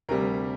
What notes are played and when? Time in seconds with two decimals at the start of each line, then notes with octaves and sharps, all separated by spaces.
0.09 D2 C3 G3 A#4